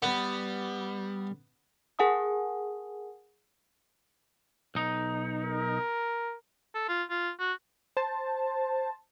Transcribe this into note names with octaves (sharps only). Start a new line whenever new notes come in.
G3 B3
G#4 A#4 F#5 G#5 A5 D#6
B1 D#4
A#4
A4
F4
F4
F#4
C5 A5